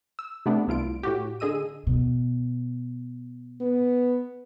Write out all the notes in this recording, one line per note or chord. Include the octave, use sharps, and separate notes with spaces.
E6
C3 A3 B3 D4
C2 E4 F4 D7
A2 F#4 G4
D3 G#4 D#5 E6 D#7
B2
B3